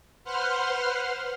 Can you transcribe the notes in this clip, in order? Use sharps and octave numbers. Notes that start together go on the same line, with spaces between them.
B4 C5 F#5 C6 F6